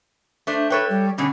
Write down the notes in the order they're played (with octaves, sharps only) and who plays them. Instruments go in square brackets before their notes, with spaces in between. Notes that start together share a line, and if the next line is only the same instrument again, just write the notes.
[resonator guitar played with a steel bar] A3 D4 C5
[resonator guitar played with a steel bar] A4 C#5 G5 [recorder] B4
[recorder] G3
[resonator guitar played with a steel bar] B2 D3 G3 [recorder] C#4